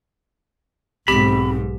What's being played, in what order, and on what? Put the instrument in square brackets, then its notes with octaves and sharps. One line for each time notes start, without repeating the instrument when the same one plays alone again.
[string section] B1 G#2 [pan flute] C4 [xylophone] G4 B6 [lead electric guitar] B5